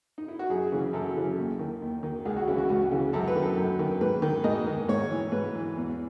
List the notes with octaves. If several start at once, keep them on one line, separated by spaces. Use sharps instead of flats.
D#4
E4
F#4
F#2 G#4
C#3 E3
F#2 A4
C#3 E3
D#2
D#3
D#2
D#3
C#2 G#4
F#4
C#3 E3 E4
F#4
C#2 F#4
C#3 E3
F#2 A4
B4
D#3
A4
F#2
D#3
G#2 B4
D#3
G#2 D#5
D#3
G#2 C#5
E3
G#2 B4
E3
E2